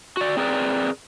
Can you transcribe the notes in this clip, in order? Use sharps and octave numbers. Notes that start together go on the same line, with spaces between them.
F#4 D5
C4 G#4 A#4 B4 D5